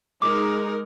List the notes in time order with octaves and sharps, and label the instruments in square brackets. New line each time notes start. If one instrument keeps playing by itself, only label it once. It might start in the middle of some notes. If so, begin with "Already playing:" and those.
[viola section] G#3 D#4 A#4 [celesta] D6